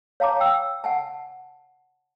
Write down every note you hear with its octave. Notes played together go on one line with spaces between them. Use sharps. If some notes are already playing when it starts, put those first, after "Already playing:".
C#5 F5 A5 A#5 D6
G5 E6
F#5 G#5 A5